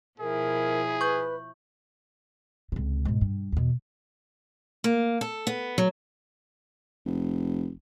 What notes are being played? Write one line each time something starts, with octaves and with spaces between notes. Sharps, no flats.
B2 F3 E4 G#4 A#4
B4 C#6 G6
C#2 C3
G#2 B2
G2
E2 B2
A#3
A4
B3
F#3
F1